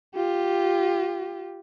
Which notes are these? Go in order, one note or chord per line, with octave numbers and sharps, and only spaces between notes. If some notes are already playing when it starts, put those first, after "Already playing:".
F4 G4